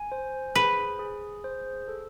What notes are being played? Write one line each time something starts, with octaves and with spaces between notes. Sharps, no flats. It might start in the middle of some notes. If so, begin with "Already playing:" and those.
Already playing: G#5
C5
G#4 B4
G#4
C5
A4